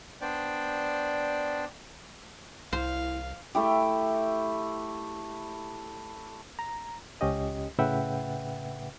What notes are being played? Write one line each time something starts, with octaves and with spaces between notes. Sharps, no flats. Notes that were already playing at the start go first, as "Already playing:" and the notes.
B3 D4 C5 D5 G5
C2 E4 C5 F5
A3 E4 G4
A#5
C#2 C#4 G4 D#5
A2 C#3 B4 E5 F#5 G5